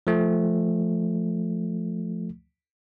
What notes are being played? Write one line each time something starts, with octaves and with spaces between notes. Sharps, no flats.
F3 A3